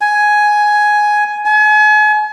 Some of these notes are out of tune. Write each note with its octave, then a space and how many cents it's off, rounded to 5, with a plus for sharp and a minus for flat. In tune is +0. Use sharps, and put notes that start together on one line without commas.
G#5 +10
G#5 +40